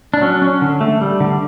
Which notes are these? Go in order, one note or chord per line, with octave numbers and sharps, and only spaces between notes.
D4
F#3 C#4
C#4
D3
A3
G3
D3